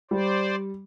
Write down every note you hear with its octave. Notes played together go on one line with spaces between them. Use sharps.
G3 C5 D5